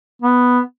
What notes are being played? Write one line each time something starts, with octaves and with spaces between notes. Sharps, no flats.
B3